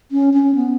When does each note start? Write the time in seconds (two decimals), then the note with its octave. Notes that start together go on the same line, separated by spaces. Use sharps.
0.11 C#4
0.34 C#4
0.55 B3